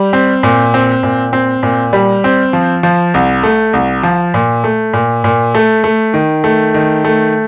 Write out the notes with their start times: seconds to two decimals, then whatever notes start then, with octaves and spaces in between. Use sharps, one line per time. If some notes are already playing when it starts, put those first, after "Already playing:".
Already playing: G3
0.13 C4
0.43 A#2
0.74 C4
1.03 A#2
1.33 C4
1.63 A#2
1.93 G3
2.24 C4
2.53 F3
2.83 F3
3.14 C2
3.43 A3
3.73 C2
4.03 F3
4.34 A#2
4.64 A3
4.93 A#2
5.24 A#2
5.55 A3
5.84 A3
6.14 D#3
6.44 A3
6.74 D#3
7.05 A3